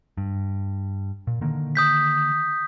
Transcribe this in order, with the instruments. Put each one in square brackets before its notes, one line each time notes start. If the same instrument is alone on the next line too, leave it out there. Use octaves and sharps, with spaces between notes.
[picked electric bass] G2
A#2
D3 D#3 A#3
[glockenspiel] D#6 G6 B6